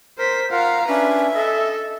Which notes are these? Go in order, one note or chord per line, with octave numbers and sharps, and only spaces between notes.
A#4 C5 B6
F4 A#4 F5 F#5 A#5
C#4 D4 B4 E5
A4 D#5